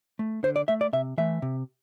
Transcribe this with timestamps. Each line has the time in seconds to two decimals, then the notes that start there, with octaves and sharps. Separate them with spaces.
0.19 A3
0.43 D3 C5
0.56 D5
0.68 A3 E5
0.81 D5
0.93 C3 E5
1.18 E3 A3 E5
1.42 C3